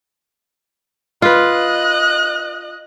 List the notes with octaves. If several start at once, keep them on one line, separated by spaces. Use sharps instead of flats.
F4 B4 D#5 F#6